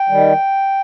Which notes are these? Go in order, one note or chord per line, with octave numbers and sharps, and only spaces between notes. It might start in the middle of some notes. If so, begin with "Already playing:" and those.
Already playing: G5
D#3 G3